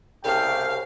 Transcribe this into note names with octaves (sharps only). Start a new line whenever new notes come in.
C2 C#3 A3 G4 F5 G5